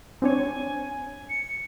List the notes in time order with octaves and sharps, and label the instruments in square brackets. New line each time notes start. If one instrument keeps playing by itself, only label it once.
[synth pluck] C4 D4 C#5 [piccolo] G#5
[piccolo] C#7